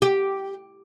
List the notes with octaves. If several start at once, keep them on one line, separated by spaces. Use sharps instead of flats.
G4